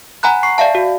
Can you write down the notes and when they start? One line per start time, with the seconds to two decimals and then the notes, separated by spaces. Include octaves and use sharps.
0.23 F#5 G#5 A#5 B5 F#6
0.43 C#6 C7
0.58 D5 E5 F5 A5
0.75 F#4